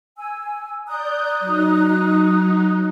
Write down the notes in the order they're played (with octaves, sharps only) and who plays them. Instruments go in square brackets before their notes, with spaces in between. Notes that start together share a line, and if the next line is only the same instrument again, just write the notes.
[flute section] G#5 E6
[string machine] D5 G6 [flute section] A#5 D#6 F#6
[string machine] F#3 D#4